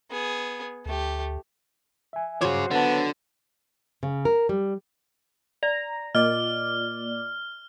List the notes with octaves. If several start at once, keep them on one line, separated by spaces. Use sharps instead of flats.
B3 G#4
D2 A3 G4
E5 G#5
G2 F#3 F#4 G#4 C5 C#5 C6 D6
D3 B3 C#5 A5
C#3
A#4
G3
D5 A#5
A#2 D5 D#5 F6